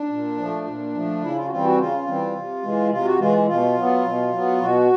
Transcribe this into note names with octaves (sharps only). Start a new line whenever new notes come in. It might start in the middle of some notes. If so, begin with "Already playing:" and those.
Already playing: D4
A#2
F3 A3
A#2
F3 A3
C#3 E4
F4
F#4
E3 G3 C4 F4
F#4
C#3 F4
E3 G3 C4
C3
E3 G#3
C3 F4
F#4
E3 G#3 F4
B2 F4
F#3 B3
B2
F#3 B3
B2 F#4